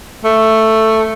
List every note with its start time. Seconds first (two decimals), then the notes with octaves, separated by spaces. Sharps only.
0.25 A3